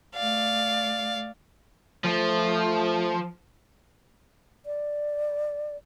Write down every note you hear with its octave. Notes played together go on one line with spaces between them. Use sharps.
A3 D5 F5
F3 A3
D5